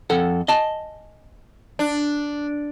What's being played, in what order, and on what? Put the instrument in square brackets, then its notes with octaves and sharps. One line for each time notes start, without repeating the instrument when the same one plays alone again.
[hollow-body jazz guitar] F2 A4 F#5
D#5 G#5 A5
[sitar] D4